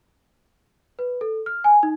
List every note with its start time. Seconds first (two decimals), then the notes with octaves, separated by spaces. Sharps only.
0.99 B4
1.21 A4
1.46 F6
1.64 G#5
1.83 D#4